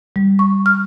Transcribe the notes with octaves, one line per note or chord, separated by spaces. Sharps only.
G3
C#6
F6